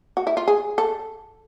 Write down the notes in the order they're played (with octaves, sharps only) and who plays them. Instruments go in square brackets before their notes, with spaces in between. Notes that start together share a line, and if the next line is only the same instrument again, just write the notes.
[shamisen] F#4
E4
F4
G#4
A4